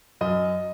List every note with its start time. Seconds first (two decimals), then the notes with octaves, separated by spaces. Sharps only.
0.21 F#2 D#5